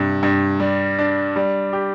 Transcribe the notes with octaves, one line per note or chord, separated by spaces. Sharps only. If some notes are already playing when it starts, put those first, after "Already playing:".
Already playing: G2 C3
G2
G3
D4
G3
G4